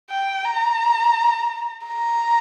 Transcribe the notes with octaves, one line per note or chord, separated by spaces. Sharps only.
G5
A#5
A#5